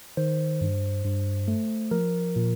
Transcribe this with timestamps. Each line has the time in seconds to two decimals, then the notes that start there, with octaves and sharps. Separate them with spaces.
0.17 D#3 C5
0.61 G2
1.05 G2
1.48 A3
1.91 F3 A#4
2.36 A#2